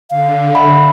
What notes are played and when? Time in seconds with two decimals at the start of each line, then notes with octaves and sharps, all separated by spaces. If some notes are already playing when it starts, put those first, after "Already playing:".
0.10 D3 F5
0.55 E5 F#5 B5